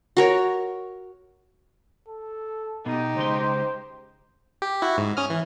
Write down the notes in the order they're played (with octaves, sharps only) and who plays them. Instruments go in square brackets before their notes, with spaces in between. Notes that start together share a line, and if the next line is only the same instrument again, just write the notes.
[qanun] F#4 A#4 C#5
[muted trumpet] A4
[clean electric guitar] B2 B3 [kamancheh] D#4 G4
[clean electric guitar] C#2 G#3 C6 [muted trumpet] C5
[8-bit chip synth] G4
E4 F#4
G#2
C#4 D#6 F6
E3